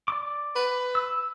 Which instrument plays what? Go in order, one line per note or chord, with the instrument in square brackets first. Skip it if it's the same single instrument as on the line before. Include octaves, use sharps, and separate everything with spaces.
[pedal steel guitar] D5 D6
[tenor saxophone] B4
[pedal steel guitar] E6